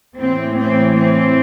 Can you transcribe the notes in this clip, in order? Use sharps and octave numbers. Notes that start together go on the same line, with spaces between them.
A2 E3 C4
C4
C4